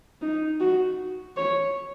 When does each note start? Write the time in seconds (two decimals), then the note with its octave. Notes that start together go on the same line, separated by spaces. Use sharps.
0.21 D#4
0.60 F#4
1.37 C#5